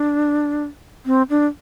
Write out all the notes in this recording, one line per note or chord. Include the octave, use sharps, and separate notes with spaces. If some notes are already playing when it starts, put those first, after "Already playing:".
Already playing: D4
C4
D4